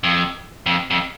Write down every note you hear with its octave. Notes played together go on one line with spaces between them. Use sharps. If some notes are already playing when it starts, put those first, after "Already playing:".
F2
F2
F2